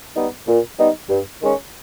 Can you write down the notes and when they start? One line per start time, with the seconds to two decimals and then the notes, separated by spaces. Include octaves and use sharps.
0.16 G3 B3 D#4
0.47 A#2
0.78 G3 B3 D#4
1.09 G2
1.40 D#3 G#3 C#4